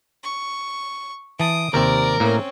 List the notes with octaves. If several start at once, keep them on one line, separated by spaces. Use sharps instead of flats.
C#6
E3 A5 D#6 D7
D#2 C3 C4 A#4 D5
A2 A#3 C4 C#4